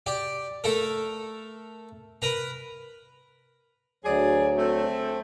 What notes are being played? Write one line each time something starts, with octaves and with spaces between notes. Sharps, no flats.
G4 D5
A3 A4 A#4
A#4 B4 A#5
D2 F#3 G#4 D5
A3 C4